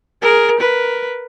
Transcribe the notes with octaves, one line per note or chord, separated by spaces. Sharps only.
G#4 A#4
A#4 B4